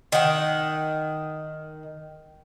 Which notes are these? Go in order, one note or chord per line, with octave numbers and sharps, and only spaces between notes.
D#3 F#5